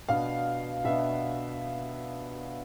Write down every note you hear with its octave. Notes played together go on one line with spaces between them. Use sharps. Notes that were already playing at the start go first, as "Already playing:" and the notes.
B2 B3 D4 F5
B2 B3 D4 E5